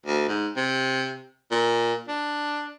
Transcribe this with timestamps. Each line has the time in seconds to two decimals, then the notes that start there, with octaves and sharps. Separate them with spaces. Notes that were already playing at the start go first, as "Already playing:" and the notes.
0.06 D2
0.29 G#2
0.56 C3
1.51 A#2
2.08 D4